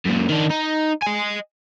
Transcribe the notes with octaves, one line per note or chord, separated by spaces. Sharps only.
F#2 A#2
D#3 D4
D#4
D#5 G#5